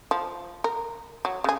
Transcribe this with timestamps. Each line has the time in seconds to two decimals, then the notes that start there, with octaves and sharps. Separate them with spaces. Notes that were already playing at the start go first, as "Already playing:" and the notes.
0.11 F3
0.64 A#4
1.25 F#3
1.44 C#3 G#4